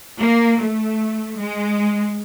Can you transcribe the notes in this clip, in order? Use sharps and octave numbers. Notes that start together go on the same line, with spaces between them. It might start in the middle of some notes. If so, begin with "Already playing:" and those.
A#3
A3
G#3